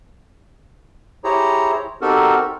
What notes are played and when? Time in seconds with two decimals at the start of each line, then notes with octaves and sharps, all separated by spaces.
1.24 E4 G4 G#4 C5 C#5 A#5
2.01 C4 D#4 F#4 G4 A4 A#4